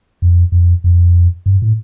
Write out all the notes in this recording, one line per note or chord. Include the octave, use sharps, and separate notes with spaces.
F2
F2
F2
G2
A2